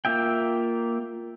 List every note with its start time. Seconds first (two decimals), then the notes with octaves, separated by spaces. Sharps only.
0.05 A#3 F4 E5 G5